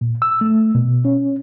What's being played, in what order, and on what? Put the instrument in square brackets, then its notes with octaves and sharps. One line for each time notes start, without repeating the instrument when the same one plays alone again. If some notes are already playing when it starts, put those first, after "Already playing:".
[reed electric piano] A#2
E6
A3
B2
C#4